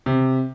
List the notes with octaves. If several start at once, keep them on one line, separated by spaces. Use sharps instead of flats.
C3